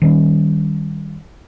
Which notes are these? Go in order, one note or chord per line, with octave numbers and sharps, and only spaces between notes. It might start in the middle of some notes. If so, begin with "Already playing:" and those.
D#3 G3 C#4